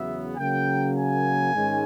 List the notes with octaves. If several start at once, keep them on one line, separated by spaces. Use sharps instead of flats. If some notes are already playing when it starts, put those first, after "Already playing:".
Already playing: E2 C#3 F#3 B3 E5
C#3 F#3 A#3 G5
G#5
G#2 D#3 G#3 C#4